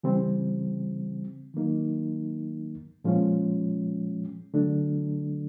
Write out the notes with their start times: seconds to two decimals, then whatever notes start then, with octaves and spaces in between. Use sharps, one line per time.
0.03 C#3 E3 G3 C4
1.54 D#3 F#3 A#3 D#4
3.04 A#2 F3 G#3 C#4
4.54 D3 F#3 A3 D4